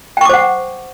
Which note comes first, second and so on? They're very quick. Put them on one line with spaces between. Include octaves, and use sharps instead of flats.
G5 C#6 D6 C5 F#5